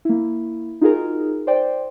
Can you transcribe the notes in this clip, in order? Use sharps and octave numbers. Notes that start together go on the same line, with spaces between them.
A#3 E4
D#4 F4 F#4 G#4 A#4
C5 D5 G5